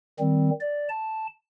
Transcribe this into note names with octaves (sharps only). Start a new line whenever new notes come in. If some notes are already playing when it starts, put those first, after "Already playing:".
D#3 G3 C4
D5
A5